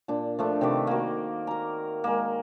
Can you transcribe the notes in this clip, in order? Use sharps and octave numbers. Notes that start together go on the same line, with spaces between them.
A#2 D4
F3 A3 D4
C3 D#3 B4 D5
A#3 F#4
A#4 A#5
G#3 A#3